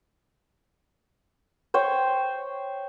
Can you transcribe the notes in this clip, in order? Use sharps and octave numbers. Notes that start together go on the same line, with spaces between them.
C5 C#5 G5